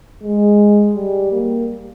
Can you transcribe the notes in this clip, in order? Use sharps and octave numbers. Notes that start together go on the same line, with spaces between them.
G#3
G3
A#3